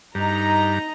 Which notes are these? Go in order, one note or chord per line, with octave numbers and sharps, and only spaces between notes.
G2 D#4 A#5